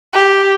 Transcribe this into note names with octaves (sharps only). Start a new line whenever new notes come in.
G4